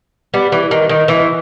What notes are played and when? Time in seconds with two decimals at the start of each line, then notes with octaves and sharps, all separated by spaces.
0.34 G3 B3
0.52 E3
0.71 D#3
0.89 D#3
1.08 E3